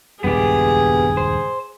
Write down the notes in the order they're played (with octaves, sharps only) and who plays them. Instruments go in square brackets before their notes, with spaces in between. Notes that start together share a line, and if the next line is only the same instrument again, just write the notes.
[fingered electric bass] D#1 C#2 G2 [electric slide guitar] B3 G4 [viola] G#4
[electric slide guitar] C5